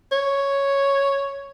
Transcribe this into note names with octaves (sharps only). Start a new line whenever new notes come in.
C#5